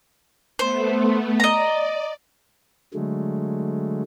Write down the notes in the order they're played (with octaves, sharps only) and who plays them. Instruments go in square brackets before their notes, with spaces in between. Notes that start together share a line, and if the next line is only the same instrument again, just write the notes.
[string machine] A3 B3 [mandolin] C5
[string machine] D5 [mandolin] D#5 A#5
[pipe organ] D3 F#3 G#3 A3